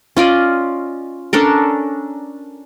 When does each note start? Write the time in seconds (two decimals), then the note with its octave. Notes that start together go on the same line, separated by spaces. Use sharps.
0.17 C#4 F4 D5 D#5
1.33 C#4 D4 A4 A#4